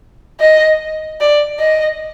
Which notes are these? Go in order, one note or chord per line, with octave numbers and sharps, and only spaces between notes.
D#5
D5
D#5